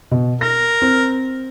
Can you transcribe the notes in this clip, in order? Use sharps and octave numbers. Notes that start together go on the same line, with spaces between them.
B2
A#4 A#6
C4